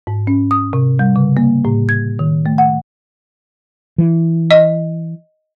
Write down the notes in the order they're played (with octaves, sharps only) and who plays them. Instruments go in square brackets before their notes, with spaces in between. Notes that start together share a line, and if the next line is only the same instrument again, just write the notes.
[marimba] G#2
C#4
D#6
C3
G3
C#3
A#3
A2
G#6
D#3
A3
F#5
[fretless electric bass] E3
[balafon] D#5